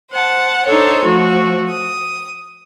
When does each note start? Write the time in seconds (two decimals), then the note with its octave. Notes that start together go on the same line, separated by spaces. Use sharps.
0.10 C5 F#5 A5
0.66 D4 D#4 A4 C5 C#5
1.04 F3 A3 F#4
1.69 D#6